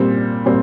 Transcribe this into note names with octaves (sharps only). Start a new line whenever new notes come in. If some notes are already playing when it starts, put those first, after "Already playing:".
Already playing: A#2 G3 C4
A#2 G3 C4